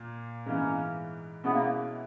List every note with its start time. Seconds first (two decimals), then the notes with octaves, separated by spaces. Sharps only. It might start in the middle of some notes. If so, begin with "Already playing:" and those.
Already playing: A#2 A#3
0.46 G#2 E3 A#3 B3 C#4
1.44 B2 G#3 B3 C#4 E4
1.53 A#3